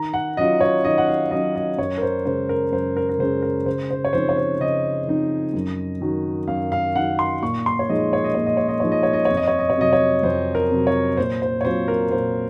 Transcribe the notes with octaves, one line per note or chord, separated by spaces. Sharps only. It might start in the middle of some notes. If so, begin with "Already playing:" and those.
Already playing: D#3 A#5
F#5
F#3 C#4 F4 D#5
C#5
D#3 D#5
F#5
F5
F#3 C#4 F4 D#5
D#5
F#2 C#5
A#4
C5
C#3 G#3 C#4 C5
A#4
F#2 C5
A#4
A#4
C#3 G#3 C#4 C5
A#4
C#3 C5
C5
C#5
F3 C4 D#4 C5
C#5
C5
C#3 D#5
F3 C4 D#4
F#2
D#3 F#3
F#2 F5
F5
D#3 F#3 F#5
C6
A#2 C#6
C6
C#5
F3 G#3 D#4 D#5
C#5
D#5
A#2 C#5
D#5
C#5
D#5
F3 G#3 D#4 C#5
D#5
C#5
D#5
F2 C#5
D#5
C#5
D#5
C#5
C3 F#3 D#5
C#5
F2 C5
A#4
C3 F#3
C#5
A#2 C5
C5
C#5
F#3 C4 F4 C5
A#4
A#2 C5